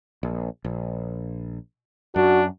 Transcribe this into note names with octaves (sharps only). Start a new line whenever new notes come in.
A#1
A#1
F#2 D4 F#4